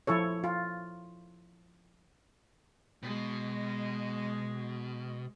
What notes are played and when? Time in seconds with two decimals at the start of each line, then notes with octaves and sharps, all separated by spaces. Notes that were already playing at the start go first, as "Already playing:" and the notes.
0.07 F3 E4 A4 C#5
0.44 F4
3.03 B2 G#3